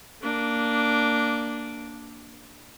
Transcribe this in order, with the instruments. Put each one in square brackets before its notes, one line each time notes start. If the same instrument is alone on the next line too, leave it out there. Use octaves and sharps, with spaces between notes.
[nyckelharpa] A#3 D4